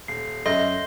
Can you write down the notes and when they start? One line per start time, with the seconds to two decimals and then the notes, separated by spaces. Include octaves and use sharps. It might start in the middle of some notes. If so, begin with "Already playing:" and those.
0.08 D#1 C7
0.46 F#2 A4 D#5 E5 C6 G6